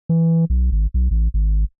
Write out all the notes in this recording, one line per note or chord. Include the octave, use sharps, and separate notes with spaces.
E3
B1
G#1
B1
A1
G#1